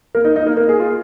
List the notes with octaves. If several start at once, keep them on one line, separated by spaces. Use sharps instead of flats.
A#3 A#4
D#4 D#5
D#4 D#5
A#3 A#4
A#3 A#4
G#4
F4